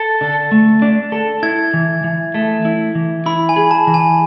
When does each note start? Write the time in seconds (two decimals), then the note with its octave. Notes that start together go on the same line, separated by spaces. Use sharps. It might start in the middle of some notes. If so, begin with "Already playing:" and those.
Already playing: A4 A6
0.21 D3
0.52 A3
0.82 D4
1.12 A4
1.43 E4 G#6
1.74 E3
2.04 E3
2.34 A3
2.65 E4
2.95 E3
3.26 E4 B5
3.49 G#5
3.56 G#4
3.71 A5
3.87 E3
3.94 G#5